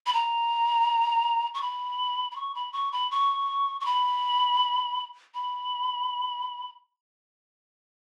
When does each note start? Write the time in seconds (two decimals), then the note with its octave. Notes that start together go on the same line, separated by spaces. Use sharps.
0.06 B5
0.13 A#5
1.54 C#6
1.62 B5
2.31 B5
2.36 C#6
2.55 B5
2.73 C#6
2.92 B5
3.11 C#6
3.80 C#6
3.86 B5
5.34 B5